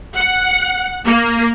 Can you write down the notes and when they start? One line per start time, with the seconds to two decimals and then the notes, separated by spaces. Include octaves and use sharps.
0.15 F#5
1.06 A#3